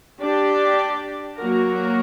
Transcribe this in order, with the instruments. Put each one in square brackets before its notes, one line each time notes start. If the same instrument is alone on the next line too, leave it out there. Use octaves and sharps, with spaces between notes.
[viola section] D4 G4 D5
F#3 A#3 F#4 A#4